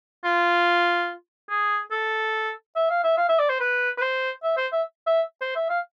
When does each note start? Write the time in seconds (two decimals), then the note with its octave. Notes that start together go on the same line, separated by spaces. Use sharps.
0.24 F4
1.50 G#4
1.92 A4
2.76 E5
2.90 F5
3.04 E5
3.18 F5
3.29 E5
3.39 D5
3.49 C5
3.60 B4
3.98 B4
4.01 C5
4.43 E5
4.57 C5
4.72 E5
5.07 E5
5.41 C5
5.56 E5
5.70 F5